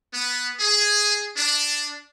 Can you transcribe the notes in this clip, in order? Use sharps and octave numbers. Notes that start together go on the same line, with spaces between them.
B3
G#4
D4